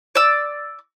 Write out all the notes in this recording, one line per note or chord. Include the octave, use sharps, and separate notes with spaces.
D5 E6